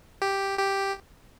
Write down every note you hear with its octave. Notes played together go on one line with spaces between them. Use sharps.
G4
G4